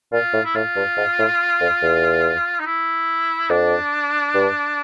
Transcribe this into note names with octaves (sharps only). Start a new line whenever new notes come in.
A#2 F4
A2
E4
A2 F4
G2
G#2
A2
F2
E2
D#4
E4
F2 D4
G2